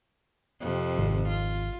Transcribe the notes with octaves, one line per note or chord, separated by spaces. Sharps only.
F2 C3
G#1
F4